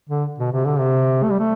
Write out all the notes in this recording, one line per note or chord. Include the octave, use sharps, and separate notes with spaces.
D3
B2
C3
D3
C3
A3
G3
A3